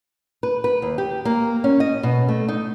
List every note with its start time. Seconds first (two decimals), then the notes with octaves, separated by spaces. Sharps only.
0.43 B4
0.64 B4
0.82 D#2
0.98 G4
1.25 A#3
1.64 C#4
1.80 D#5
2.03 B2
2.28 A3
2.49 D#4